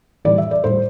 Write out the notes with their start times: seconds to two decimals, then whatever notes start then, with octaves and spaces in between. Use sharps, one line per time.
0.25 A2 E3 G3 D5
0.38 E5
0.51 D5
0.64 A2 G3 C5